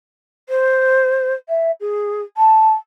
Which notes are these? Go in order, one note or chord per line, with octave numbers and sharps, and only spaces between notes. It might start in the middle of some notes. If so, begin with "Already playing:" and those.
C5
E5
G#4
A5